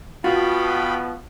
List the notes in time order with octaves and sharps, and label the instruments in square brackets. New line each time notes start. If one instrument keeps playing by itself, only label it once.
[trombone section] B2 F3 B3 [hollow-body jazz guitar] F4 F#4 [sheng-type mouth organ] F5 G5 B5